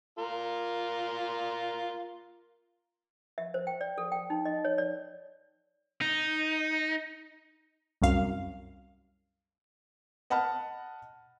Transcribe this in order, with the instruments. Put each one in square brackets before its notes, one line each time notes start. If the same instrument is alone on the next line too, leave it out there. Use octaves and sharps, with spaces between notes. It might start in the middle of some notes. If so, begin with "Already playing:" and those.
[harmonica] F4 A#4
[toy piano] E5
C5
G5
D5
A4
G5
D#4
D#5
C#5
D5
[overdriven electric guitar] D#4
[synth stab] C2 F#2 F5
[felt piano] D#5 F#5 A5 B5 F6